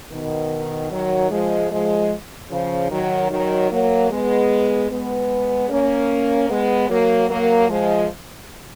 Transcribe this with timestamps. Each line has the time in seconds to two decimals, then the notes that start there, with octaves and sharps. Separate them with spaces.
0.11 B2 D#3
0.91 D#3 F#3
1.31 F3 G#3
1.70 F3 G#3
2.50 C#3 F3
2.90 D#3 F#3
3.30 D#3 F#3
3.70 F#3 A#3
4.10 G#3 B3
4.90 G#3 B3
5.70 A#3 C#4
6.49 G#3 B3
6.89 F#3 A#3
7.29 F#3 A#3
7.69 F3 G#3